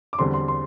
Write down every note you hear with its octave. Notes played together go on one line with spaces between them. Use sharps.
D6
E2 D3 G3 C4 C6
C6
C6